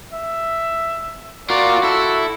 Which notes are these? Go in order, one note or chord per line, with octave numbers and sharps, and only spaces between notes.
E5
F4 F#4 A#4 D5
E4 A4